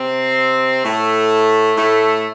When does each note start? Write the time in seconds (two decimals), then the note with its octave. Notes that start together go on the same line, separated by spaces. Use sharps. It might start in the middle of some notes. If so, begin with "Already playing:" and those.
Already playing: C3 C4
0.84 A2 A3
1.76 A2 A3